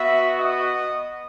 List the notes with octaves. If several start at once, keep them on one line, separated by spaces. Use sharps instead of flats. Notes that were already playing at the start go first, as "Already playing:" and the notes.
Already playing: B3 F#4 E5
D#5